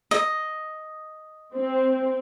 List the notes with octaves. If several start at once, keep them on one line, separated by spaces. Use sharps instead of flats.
D#5
C4